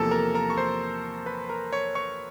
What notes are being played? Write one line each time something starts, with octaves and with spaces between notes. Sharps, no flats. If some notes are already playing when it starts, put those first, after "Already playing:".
Already playing: E2 C3 F3 A#3 A4 A5
A#4 A#5
A#4 A#5
C#6
C5 C6
B4 B5
A#4 A#5
C#5 C#6
C#5 C#6